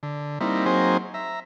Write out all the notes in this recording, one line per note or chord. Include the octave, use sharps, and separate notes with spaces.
D3
G3 A#3 C4 D#4 E4
F#3 A#3 C4 D#4 G#4 C5
E5 A#5